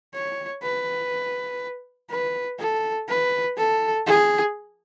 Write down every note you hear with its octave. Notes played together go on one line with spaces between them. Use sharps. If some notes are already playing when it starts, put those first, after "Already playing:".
C#5
B4
B4
A4
B4
A4
G#4